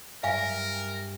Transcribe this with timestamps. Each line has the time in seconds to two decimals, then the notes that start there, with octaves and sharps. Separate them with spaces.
0.23 G2 A#4 E5 F5 G#5